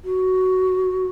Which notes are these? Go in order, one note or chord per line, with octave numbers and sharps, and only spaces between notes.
F#4